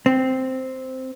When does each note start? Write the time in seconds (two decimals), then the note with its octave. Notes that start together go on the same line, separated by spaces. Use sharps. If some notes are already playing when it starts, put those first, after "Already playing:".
0.06 C4